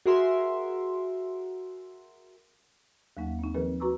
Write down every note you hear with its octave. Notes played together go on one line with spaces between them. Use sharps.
F#4 G#4 A#4 E5 C6
D#2 F#3 A#3 D#4 F#5
C4 D#4
D#3 F3 C4 G#4 A#4 B4
F#4 B4 A#5 C#6 D6 E6